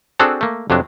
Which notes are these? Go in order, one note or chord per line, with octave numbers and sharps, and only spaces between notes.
C4 D4 F#4 G#4 A4 C5
A3 A#3
F2 C3 F#3 D4